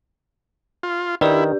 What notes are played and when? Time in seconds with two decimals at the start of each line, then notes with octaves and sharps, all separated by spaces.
0.83 F4
1.21 D#3 D4 E4 G4 B4 D5